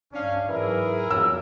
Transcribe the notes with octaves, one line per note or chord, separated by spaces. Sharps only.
G2 C#4 D4 F5
G#2 E3 F#3 E4 G#4 A#4
F2 F#3 B3 E6